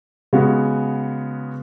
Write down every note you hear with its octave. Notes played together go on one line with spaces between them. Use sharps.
C#3 G#3 B3 F#4